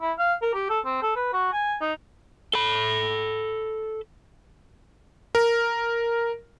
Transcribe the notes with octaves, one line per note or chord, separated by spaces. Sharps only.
E4
F5
A#4
G4
A4
C4
A4
B4
F#4
G#5
D#4
A4 B5
A#4